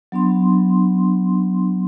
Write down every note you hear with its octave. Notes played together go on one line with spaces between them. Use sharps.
F#3 B3 D4 C6